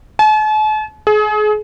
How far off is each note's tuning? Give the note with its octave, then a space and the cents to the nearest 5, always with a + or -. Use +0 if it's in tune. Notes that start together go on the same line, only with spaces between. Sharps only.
A5 -45
G#4 +35